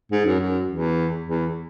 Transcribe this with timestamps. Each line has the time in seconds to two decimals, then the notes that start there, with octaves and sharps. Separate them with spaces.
0.12 G#2
0.25 F#2
0.39 F#2
0.69 E2
1.26 E2